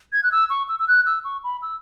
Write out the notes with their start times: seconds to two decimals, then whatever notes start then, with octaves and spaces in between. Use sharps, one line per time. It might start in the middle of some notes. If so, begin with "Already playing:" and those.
0.12 G#6
0.23 F#6
0.31 E6
0.50 C#6
0.68 E6
0.79 E6
0.88 F#6
1.06 E6
1.24 C#6
1.44 B5
1.62 E6